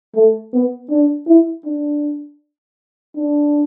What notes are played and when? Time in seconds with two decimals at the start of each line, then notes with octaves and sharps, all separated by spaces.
0.15 A3
0.54 B3
0.91 D4
1.28 E4
1.66 D4
3.17 D4